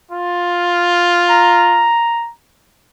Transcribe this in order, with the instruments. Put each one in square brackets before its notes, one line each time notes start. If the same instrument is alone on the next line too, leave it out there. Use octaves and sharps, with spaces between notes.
[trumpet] F4
[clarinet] A#5